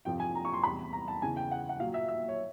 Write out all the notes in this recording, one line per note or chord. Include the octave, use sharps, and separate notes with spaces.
F2 C3 F3 G5
G#5
A#5
C#6
C6
E2 C3 E3 G3 B5
A#5
A5
E2 C#3 E3 G#5
G5
F#5
F#5
A#2 F#3 F5
E5
E5
C#5